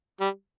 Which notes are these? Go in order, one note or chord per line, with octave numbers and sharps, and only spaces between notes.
G3